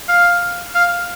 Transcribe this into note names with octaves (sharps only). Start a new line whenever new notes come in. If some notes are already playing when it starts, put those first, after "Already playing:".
F5
F5